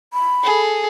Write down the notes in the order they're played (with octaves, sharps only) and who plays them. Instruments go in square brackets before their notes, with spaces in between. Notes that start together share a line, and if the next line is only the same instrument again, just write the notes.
[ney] B5
[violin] G#4 A4